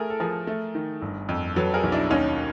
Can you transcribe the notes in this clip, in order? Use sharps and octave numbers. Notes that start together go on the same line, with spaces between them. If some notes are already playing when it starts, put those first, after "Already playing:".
Already playing: A3 G#4 A#4
A4
F3 G#4 A#4
A3
D#3
G1
F2
F#3 A4 B4
G#4 A#4
B1
D4 E4
D#2 C#4 D#4